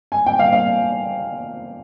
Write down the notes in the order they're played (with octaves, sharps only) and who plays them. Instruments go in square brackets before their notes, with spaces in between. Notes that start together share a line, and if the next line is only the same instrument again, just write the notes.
[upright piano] G#5
G5
F5
F5